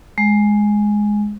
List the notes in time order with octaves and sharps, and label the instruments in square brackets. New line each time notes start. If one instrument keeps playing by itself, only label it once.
[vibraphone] G#3